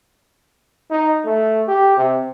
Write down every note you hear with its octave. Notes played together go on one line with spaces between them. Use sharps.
D#4
A3
G4
C3